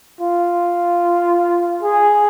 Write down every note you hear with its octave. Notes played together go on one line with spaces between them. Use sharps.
F4
G#4